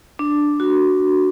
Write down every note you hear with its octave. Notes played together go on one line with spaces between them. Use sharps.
D4
F#4